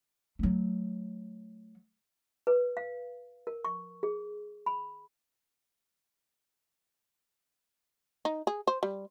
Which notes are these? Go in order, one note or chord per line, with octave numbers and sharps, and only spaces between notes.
F#3 A3
B4
F5
A#4
C#6
G#4
B5
D#4
G#4
C5
G3